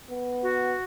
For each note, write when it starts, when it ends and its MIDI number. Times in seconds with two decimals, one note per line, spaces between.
0.10 0.75 59
0.43 0.84 66